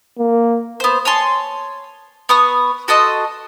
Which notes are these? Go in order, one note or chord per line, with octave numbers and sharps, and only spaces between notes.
A#3
B3 C5
C#5 G#5 A5 C6
B3 C#6 D#6
F#4 A4 D#5 C6